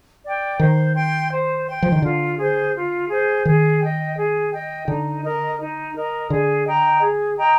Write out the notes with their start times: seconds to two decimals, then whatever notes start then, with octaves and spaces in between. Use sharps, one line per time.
0.24 D5 G5
0.59 D#3 C5
0.95 G5 C6
1.31 C5
1.67 G5 C6
1.82 F3
1.92 D#3
2.02 D3 F4
2.38 G#4 C5
2.74 F4
3.09 G#4 C5
3.45 D#3 G#4
3.81 D#5 G5
4.17 G#4
4.52 D#5 G5
4.88 D3 D#4
5.24 A#4 D#5
5.60 D#4
5.95 A#4 D#5
6.30 D3 G#4
6.66 D#5 G5 A#5
7.02 G#4
7.38 D#5 G5 A#5